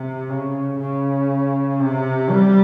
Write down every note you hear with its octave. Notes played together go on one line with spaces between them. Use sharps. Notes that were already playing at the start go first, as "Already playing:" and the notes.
Already playing: C3
C#3
C#3
C3
G3